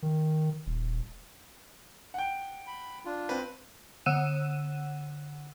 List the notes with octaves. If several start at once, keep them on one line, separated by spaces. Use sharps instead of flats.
D#3
D#1
F#5 G5
B5
D4 F4
C4 B4
D3 F#5 E6 F#6 D#7 E7